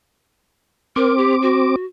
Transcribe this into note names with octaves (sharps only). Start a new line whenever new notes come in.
C4 A#4 D6
G4
F#4